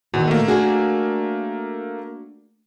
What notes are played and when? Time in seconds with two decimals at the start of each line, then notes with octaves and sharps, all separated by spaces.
0.14 E2 A#2 D#3 F#4
0.27 A3 A#3
0.47 D4 F#4 G#4